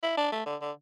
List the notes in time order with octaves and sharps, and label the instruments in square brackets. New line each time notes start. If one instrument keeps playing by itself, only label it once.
[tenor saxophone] E4
D4
A3
D3
D3